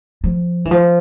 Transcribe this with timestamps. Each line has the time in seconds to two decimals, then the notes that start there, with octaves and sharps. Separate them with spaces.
0.24 F3
0.65 E3
0.71 F3